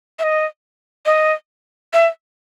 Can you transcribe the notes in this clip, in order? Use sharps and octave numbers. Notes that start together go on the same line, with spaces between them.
E5
D#5
D#5
E5